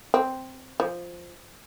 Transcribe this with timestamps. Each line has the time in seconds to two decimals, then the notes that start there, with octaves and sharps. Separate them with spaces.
0.14 C4
0.80 F3